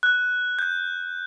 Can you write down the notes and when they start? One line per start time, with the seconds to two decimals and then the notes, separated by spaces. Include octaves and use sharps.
0.03 F#6
0.59 G6